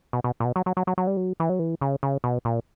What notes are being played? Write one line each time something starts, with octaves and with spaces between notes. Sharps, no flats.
B2
B2
A#2
B2
F#3
F#3
F#3
F#3
F#3
G3
F#3
E3
F#3
E3
C#3
C#3
B2
A#2